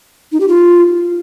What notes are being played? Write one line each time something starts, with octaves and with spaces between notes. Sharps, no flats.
D#4
G4
F4